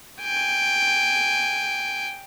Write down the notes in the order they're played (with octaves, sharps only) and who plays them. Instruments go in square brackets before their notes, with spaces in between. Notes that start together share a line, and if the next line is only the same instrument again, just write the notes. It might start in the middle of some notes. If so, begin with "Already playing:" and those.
[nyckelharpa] G5 G#5